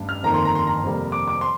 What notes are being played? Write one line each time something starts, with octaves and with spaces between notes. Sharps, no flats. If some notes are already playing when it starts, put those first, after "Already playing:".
Already playing: A1 G2
F6
G1 F2 D#3 A#3 A#5
C6
A#5
C6
A#5
F2 C3 G3 A#3
D6
D6
C6